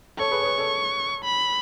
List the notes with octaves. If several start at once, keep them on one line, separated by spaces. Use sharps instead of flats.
A4 C#5 C#6
G#4 B4
C#5
G#4 B4
A4 C#5
B5